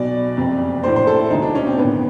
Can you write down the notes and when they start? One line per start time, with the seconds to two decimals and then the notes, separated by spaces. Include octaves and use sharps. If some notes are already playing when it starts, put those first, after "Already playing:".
Already playing: B1 B2 D5
0.37 F#1 F2 C3
0.83 A#1 A2 E3 C5
0.96 C5
1.07 A4
1.19 E4
1.31 E1 D2 D3 D#4
1.42 D4
1.55 C#4
1.67 C4
1.78 A1 G2 D#3 B3